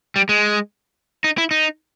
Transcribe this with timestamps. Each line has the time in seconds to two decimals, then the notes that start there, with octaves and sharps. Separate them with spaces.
0.16 G3
0.29 G#3
1.24 D#4
1.38 E4
1.51 D#4